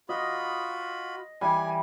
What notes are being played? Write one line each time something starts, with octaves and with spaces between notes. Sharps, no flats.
F4 F#4 D#5 B5
E3 G3 G#5